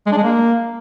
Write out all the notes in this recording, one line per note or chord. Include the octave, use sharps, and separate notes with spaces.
G#3
D4
G#3
A#3